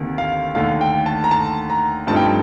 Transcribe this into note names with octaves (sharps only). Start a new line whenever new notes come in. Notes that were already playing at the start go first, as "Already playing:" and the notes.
Already playing: D2 C3 D#3 A#3
F5
D#2 D3 A3 F5
G5
A5
A#5
A5
A#5
G2 F3 A3 C4 D#4 A5
G5
A5